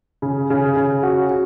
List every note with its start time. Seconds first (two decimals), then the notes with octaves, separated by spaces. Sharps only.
0.22 C#3
0.50 C#3
0.77 C#3
1.03 F#4
1.30 F#4